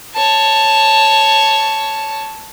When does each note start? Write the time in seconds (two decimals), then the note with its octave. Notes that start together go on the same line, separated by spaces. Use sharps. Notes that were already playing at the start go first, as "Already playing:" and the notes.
0.14 C#5 A5